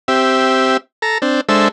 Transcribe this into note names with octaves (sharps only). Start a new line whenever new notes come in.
C4 G4 E5
A4 A#5
C4 D4
G#3 D4 A4 C5 E5